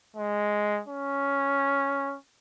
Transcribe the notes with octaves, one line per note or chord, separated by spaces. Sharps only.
G#3
C#4